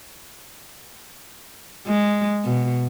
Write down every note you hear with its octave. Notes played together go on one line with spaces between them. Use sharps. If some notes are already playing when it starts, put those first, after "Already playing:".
G#3
B2